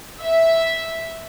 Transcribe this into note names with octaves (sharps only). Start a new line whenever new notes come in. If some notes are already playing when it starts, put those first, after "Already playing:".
E5